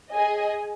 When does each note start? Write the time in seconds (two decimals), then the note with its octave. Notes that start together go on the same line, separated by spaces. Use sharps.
0.12 G#4 D#5 G#5